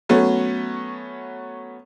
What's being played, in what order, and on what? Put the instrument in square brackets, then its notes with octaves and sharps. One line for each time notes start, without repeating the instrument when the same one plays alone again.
[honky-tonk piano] F#3 A3 B3 C#4